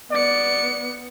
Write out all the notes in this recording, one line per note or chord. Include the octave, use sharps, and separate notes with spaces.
B3 D5 C#7